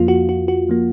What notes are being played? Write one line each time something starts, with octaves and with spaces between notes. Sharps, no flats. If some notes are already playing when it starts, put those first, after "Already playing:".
Already playing: F2 F3 A#3 F4
F#4
F#4
F#4
F3 A#3